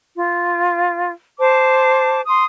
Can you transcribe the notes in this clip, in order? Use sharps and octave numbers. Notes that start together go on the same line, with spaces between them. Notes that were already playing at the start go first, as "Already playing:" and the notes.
F4
C5 A5 D6
C6 D#6